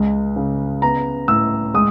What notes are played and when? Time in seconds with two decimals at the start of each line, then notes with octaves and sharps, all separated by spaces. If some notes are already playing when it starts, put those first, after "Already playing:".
Already playing: C#2 G#3
0.36 C#3
0.82 B3 A#5
1.28 A2 E6
1.74 G#3 D#6